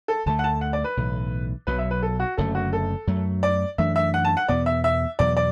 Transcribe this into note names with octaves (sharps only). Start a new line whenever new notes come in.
A4
D2 D3 F#3 A3 A5
F#5
A5
F#5
D5
B4
B1 A2 E3
B1 B2 F#3 B4
E5
B4
A4
F#4
F#1 F#2 D3 A3 A4
F#4
A4
F#2 F#3 A3
D5
F#2 E3 A3 D4 E5
E5
F#5
A5
F#5
E2 B2 B3 D5
E5
E5
E2 B2 F#3 D5
D5